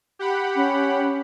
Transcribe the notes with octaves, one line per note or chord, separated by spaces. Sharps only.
G4 F#5 B5
C#4